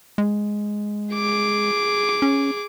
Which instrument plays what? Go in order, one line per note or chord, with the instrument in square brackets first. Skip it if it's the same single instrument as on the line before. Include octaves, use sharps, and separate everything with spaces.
[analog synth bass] G#3
[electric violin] G#4 D6
[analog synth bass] C#4